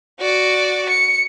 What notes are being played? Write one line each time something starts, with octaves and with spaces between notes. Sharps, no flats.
F#4 D5
C#7